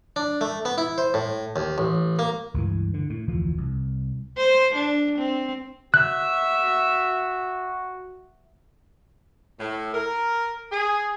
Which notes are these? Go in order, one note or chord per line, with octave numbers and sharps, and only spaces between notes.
D4
A3
B3
E4
C5
A2
D#2
A1
A#3
C#2 G2 E3
D3
A2
F1 D2 E3 F3
C2
C5
D4
C4
F#4 E5 F#6
A2
A#4
G#4